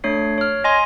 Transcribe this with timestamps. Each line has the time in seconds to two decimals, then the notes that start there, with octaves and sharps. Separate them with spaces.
0.04 A3 D4 C#5 C7
0.38 C#5 F6
0.64 D#5 G#5 C6 A#6